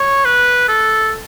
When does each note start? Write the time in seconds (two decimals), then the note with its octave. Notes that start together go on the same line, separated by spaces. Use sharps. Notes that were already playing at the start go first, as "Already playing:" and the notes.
Already playing: C#5
0.25 B4
0.68 A4